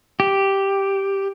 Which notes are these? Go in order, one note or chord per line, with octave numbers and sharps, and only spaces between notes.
G4